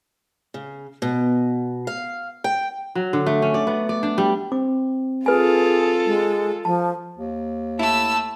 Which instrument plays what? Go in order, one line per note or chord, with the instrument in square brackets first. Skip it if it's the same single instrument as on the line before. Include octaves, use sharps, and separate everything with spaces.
[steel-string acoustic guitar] C#3
B2
F5
G5
[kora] F#3
D3
A3
C#4
D5
B3
D5
D4
G3
[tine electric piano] C4 [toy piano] D6
[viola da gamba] F4 A4 [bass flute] G#4 [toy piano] B4 G#5
[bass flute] G#3
[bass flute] F3 [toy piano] A5
[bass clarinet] D#2
[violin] A3 E6 [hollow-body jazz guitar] E4 [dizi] A5